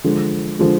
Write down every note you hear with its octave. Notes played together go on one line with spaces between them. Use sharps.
D3 F3 G#3
D3 F3 G#3